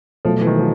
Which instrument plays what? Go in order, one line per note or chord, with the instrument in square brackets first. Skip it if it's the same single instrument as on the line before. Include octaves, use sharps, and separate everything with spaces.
[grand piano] B2 F#3 A3 [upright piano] F3
[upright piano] E3
D#3
F3